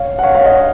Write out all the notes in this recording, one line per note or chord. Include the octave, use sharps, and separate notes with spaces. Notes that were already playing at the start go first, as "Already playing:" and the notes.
Already playing: C#5 F5
F#5
C#5 F5
C#5 F5
D#5 F#5